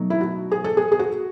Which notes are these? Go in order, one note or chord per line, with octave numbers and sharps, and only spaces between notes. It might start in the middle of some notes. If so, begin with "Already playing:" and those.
Already playing: B2 F#3 A3 D#4
E4
F#4
G#4
A4
G#4
G#4
F#4